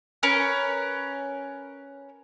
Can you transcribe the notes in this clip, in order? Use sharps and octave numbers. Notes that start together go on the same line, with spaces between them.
C#4 A#4 B4